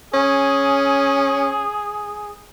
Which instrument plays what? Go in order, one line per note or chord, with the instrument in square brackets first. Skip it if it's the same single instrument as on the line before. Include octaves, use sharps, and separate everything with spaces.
[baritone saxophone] C#4 [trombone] G#4